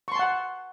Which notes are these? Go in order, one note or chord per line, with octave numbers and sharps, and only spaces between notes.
F#5 A5 C6 C#6